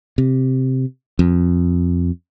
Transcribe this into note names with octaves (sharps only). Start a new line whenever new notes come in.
C3
F2